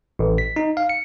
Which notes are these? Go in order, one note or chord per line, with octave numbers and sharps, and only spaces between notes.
A1
B6
D#4
F5
C#7